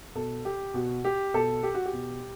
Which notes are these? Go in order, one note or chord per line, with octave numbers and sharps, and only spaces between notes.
B2 A4
G4
B2 F#4
G4
B2 A4
G4
F#4
G4
B2